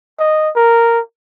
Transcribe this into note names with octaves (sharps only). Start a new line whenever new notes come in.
D#5
A#4